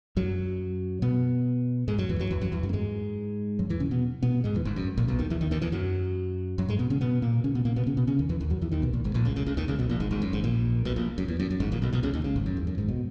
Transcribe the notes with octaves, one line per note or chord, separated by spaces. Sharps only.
F#2 F#3
B2 B3
G#2 G#3
F#2 F#3
E2 E3
F#2 F#3
E2 E3
F#2 F#3
E2 E3
F#2 F#3
A#3
G#2 G#3
F#2 F#3
E2 E3
C#3 C#4
B2 B3
B2 B3
G#2 G#3
E2 E3
G#1 G#2
F#2
A#1 A#2
B1 B2
D#2 D#3
E2 E3
D#2 D#3
D#2 D#3
E2 E3
F#2 F#3
F#2 F#3
G#2 G#3
B2 B3
C#3 C#4
B2 B3
A#2 A#3
C#3 C#4
B2 B3
A#2 A#3
B2 B3
C#3 C#4
B2 B3
C#3 C#4
D#2 D#3
E2 E3
D#2 D#3
F#2 F#3
E2 E3
D#2 D#3
B1 B2
A#1 A#2
G#1 G#2
A#1 A#2
C#2 C#3
C#2 C#3
C#2 C#3
D#2 D#3
C#2 C#3
B1 B2
A#1 A#2
G#1 G#2
G#1 G#2
F#2
G#1 G#2
A#1 A#2
B1 B2
A#1 A#2
F#2
E2
F#2
F#2
G#1 G#2
A#1 A#2
B1 B2
B1 B2
C#2 C#3
D#2 D#3
C#2 C#3
G#1 G#2
F#2
E2
F#2
G#1 G#2
B2